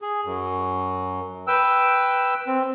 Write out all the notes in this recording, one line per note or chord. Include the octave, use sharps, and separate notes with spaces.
G#4
F#2
B4 G5 E6
C4